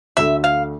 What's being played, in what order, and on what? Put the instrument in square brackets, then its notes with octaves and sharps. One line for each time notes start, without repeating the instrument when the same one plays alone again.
[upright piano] D2 D3 A3 [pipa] E5
[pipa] F5